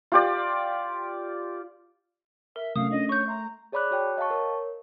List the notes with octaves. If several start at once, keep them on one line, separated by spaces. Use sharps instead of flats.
F4 G4 D5
A#4 E5
C3 F#3 A3 C#4 F5 D#6
C#4 D4 F4 D#5
C#5 C#6 G6
E5 A#5 C6
G#4 C#5 D5 B5 D6 F#6
F#4 C#5 G5 A5 F#6
D#5 F5 G5 A5 C#6
A#4 C#5